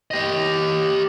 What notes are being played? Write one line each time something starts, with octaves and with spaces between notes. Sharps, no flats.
G4 D#5